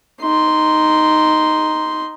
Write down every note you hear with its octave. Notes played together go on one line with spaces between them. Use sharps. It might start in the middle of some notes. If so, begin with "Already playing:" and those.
D#4 C6